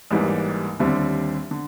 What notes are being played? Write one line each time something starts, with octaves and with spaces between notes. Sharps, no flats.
A1 G#2 E3 G3 A#3
D#2 D3 G3 C4 E4
D3